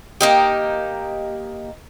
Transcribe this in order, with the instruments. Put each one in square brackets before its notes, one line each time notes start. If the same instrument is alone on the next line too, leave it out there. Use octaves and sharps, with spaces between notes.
[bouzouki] A#3 D#4 G4